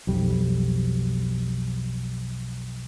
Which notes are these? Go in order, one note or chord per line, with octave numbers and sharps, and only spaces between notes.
B1 F2 G3